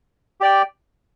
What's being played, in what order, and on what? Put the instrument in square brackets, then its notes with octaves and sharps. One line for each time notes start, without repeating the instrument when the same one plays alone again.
[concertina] G4 D5 G5